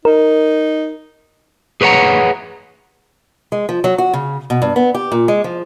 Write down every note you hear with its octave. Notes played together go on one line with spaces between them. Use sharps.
D#4 A#4
G#4 B4 C#5 D#5 F#5 A#5
G#3
F3
F#3
F#4
C#3
B2
G2
B3
G4
A#2
G#3
F3